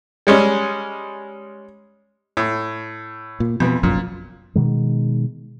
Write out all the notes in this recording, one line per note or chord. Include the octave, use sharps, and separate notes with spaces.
G3 G#3 C#4
A2
A#2
F2 B2 E3
F1 A#1 F#2 A#2
B2 D#3 G#3